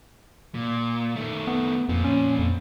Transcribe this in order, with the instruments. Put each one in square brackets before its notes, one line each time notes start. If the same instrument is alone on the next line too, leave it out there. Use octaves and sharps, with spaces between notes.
[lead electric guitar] A#2
D#3 A3
[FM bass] B3
[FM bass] F2 [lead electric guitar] A#2 F3
[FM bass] C#4
F2